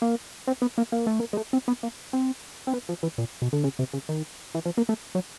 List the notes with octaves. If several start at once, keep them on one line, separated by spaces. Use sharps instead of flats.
A#3
C4
B3
A#3
A#3
A3
A#3
G#3
A3
C4
B3
A#3
C4
C4
B3
F3
E3
A#2
B2
D3
C#3
C3
C#3
D#3
E3
F3
A#3
A3
F#3